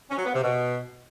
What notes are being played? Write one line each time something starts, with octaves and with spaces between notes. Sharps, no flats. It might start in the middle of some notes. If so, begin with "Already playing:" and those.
C#4
F#3
B3
C3
B2